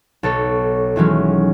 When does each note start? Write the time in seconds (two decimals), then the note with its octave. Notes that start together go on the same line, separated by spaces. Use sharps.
0.23 B1 A4 C#5
0.96 D#3 E3 F#3 G#3 C#4